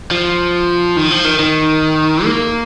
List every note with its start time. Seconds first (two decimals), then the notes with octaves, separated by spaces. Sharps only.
0.11 F3
0.97 D#3
1.11 F3
1.25 D#3
1.39 D#3
2.25 A#3